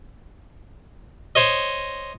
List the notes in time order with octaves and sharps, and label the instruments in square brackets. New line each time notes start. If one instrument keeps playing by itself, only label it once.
[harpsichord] C5 C#5 D#5